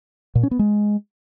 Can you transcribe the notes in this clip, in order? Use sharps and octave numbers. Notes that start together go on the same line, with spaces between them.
A#2
C#4
B3
G#3